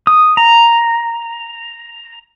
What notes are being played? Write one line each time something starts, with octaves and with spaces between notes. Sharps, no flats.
D#6
A#5